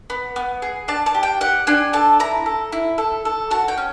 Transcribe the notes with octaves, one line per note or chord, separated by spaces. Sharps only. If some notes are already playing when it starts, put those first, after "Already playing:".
B3
B3
G#4
D4 A5
A5
G4
G5
G4 F#5
D4 G#5
A4 A5
E4 A#5
A4
E4
A4
A4
F#4 A5
G5
C#4